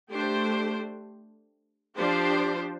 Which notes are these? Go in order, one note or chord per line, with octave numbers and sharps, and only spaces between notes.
A3 D4 G4 C5
F3 D4 G4 C5